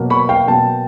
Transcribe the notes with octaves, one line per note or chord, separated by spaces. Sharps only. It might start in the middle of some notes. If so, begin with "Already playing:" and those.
Already playing: B2 F#3 A#3
B5 C#6
F5 G5
B2 F#3 A#3 G5 A5